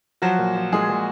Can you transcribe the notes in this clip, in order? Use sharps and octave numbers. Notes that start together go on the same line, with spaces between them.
F3 F#3 F#4
A#2
F3
A#2 G#3 G#4
A#2